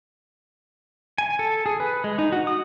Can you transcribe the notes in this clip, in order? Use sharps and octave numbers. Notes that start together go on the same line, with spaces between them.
G#5
A4
G#4
B4
G#3
D#4
F#4
D#6